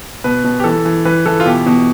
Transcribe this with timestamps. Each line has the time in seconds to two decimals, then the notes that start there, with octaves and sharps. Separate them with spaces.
0.24 B2 B4
0.44 B2
0.60 G4
0.64 E3 A4
0.85 E3
1.05 E3 B4
1.26 E3 A4
1.40 F4
1.46 B2 G4
1.67 B2